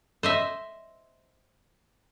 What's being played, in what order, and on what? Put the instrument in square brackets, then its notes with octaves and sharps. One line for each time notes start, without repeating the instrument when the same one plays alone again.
[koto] C5 D#5 E5